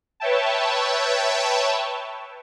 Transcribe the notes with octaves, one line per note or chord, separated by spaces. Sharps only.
B4 C#5 E5 G5 A5